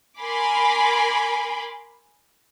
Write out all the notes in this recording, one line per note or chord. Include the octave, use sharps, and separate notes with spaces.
A#4 G#5 B5 C6 D6